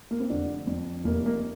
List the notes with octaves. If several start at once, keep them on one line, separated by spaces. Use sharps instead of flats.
A#3
C4
F1 D3 D4
F2
F1 A#3
A#3